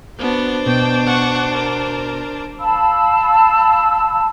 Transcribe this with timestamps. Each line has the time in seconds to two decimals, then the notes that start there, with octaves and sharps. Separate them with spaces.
0.19 B3 D4 F#4 C5
0.66 B2 G5
1.07 F#5 C#6
1.52 A#4
2.59 F5 A5 B5 E6